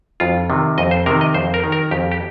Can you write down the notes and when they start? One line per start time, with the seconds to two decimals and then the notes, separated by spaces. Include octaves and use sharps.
0.20 F2 F4
0.50 C3 D#3
0.78 F2 D#5
0.91 C5
1.06 C3 D#3 A#4
1.21 D#5
1.34 F2 C5
1.54 A#4
1.64 D#3
1.72 A#4
1.91 F2 G4
2.12 G4